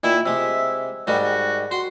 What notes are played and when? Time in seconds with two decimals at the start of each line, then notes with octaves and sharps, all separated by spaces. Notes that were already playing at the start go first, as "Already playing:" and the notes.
0.04 A#2 D#3 E4 E5
0.26 C3 G#3 E5
1.07 G#2 D#3 G3 F#4
1.23 F#4
1.71 F#4 C6